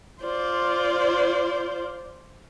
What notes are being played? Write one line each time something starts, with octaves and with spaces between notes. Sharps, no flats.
F4 C5 D5